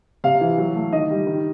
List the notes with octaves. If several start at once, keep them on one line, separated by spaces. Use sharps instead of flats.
C3 F5
E3
F#3
A3
D#3 D#5
G3
D#3